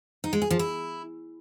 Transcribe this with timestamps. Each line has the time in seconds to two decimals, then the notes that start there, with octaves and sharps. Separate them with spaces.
0.24 D#4
0.33 G#3
0.42 G#4
0.51 F3
0.59 E4